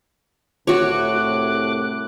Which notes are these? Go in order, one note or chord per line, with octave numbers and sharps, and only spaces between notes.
C2 A2 F#4 C#5 D6 F#6